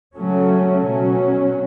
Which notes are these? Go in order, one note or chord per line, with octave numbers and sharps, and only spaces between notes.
C#3 F#3 A3 C#4
B2 F#3 C#4